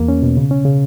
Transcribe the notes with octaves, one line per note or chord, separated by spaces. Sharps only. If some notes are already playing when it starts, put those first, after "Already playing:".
Already playing: E2 A#3
C#4
B2
C#3
C#4
C#3